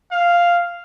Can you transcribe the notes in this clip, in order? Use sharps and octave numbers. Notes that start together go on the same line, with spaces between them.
F5